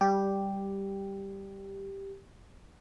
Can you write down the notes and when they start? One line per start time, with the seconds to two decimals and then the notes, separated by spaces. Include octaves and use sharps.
0.01 G3 G4